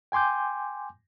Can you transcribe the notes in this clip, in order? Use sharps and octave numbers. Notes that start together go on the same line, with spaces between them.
G5 G#5 C6 D6 G6